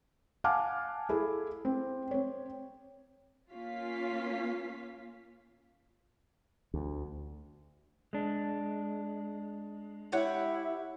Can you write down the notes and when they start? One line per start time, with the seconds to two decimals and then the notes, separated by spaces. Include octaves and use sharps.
0.44 F5 F#5 G#5 A5 D6 F6
1.09 E4 G#4 A4
1.65 C4
2.11 C4 C#5
3.52 A#3 C#4 F4 F5 B6
6.74 D2
8.13 G#3 D4
10.12 E4 G4 C#5 F#5